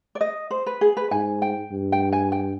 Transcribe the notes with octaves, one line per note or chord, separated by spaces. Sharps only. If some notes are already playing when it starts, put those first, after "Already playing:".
D5
D#5
C5
B4
G#4
B4
G#2 G#5
G5
G2
G5
G#5
G5